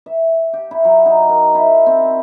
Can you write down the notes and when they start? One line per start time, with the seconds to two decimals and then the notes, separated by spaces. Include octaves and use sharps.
0.06 E5
0.53 G4
0.71 E4
0.85 F#3
1.06 D#4
1.29 A#4
1.55 E4
1.86 C4